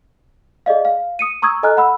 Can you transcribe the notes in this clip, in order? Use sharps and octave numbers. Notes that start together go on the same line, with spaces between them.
G#4 D5 D#5 F5
F5
D#6 C#7 D#7
A#5 C#6 D#6 E6 G#6
A4 D#5 G#5 A#5 F6 F#6
F#5 B5 E6